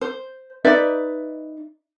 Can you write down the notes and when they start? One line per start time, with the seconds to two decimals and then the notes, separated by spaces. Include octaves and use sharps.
0.01 C5
0.65 D#4 B4 D5 E5